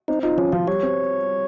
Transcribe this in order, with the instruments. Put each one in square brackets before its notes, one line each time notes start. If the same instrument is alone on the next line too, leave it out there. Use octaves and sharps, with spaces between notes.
[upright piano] C4 [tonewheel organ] D#4
[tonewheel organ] D#4 [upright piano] F4
[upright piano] F3 [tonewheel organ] C#4
[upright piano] F3 [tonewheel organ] F4
[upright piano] G3 [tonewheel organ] C#5
[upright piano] C4